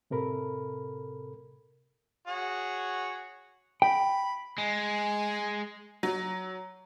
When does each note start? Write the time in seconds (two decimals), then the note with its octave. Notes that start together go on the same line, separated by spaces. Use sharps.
0.10 A2 C3 A4 A#4 B5
2.27 F#4 G#4 C#5
3.82 G5 B5
4.58 G#3 G#5
6.03 F#3